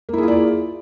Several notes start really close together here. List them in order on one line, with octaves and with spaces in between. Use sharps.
A#3 E4 G#4 F4 D5